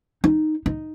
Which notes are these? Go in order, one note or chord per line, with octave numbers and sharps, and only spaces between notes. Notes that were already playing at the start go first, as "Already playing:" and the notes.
D#4
D#4